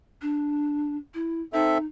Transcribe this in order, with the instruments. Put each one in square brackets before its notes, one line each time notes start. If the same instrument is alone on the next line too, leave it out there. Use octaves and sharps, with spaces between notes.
[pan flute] D4
E4
[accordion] C4 A4 E5 [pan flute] D#4